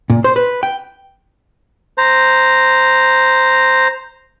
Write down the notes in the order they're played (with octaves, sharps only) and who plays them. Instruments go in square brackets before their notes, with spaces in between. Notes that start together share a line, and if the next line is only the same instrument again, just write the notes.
[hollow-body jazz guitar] A#2
C5
B4
G5
[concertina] C5 A#5